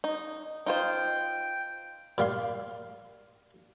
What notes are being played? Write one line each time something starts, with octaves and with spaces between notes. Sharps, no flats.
D#4
D#4 F4 C5 G5
A#2 G3 F5 C6